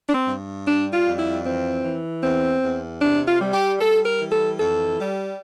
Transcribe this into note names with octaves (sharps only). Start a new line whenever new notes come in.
D4
C4
G2
G3 D4
F4
F2
E4
E3 C4
E3
E2 C4
E2
C3 D4
F4
G3
G4
G3 A4
A#4
E3
A4
F2 A4
G3